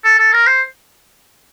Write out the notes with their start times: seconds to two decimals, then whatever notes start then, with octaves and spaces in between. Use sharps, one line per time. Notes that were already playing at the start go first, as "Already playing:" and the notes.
0.04 A4
0.19 A4
0.33 A#4
0.47 C5